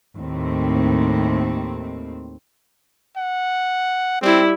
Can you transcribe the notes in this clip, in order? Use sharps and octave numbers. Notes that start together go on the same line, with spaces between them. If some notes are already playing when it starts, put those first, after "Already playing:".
D#2 A2 C4
F#5
G3 C4 E4